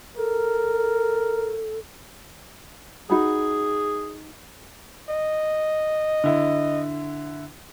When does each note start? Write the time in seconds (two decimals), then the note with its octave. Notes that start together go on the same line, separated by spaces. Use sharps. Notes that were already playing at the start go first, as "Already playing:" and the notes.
0.17 A4 A#4
3.10 D#4 F#4 G#4 B5
5.10 D#5
6.24 D3 E4